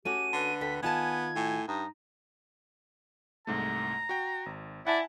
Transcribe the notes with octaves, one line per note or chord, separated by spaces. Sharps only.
A3 C#4 F#4 G4 D#7
D3 B4
D2 A4 G5 B6
D#3 B3 F4 G#5 A5 G#6
A2 G#5
G2 D#4 D#6
C2 G#2 A3 A#5
F#4 G5
G#1
E4 D5 F#5 G#5 A5